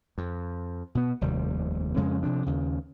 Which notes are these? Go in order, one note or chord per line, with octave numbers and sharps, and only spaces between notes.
F2
B2 B3
F1 D#2 C3 G3
F2 C#3 G#3 C#4
C3 F3 D4
D#2 C#3